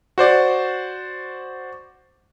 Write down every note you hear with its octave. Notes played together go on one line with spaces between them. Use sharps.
F#4 C5 D5